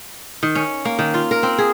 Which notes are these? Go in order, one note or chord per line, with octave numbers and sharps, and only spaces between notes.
D#3
C#4
A#3
D#3
F4
A#4
C4
G#4